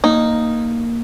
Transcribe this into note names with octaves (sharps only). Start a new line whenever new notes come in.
A#3 D#4